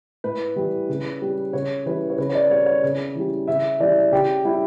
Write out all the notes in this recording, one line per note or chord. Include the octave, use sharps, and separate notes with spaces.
A2 B4
E3 G3
C#3
G3
C#3 C#5
E3 G3 B4
C#5
C#3 B4
C#5
D5
G3 C#5
C#5
C#3
E3 G3
C#3 E5
E3 G3 D5
C#3 G4
G3 E4